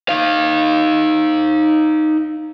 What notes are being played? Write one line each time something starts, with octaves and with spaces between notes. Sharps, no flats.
D#4 F5